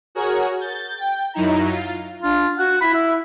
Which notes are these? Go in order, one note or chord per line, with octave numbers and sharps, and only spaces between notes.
F#4 G#4 A#4 C#5
G6 A6
G5 G6
F#2 F#3 D#4 E4 A#5
F4
D4 F4
F#4 F#5
E4 B5
E5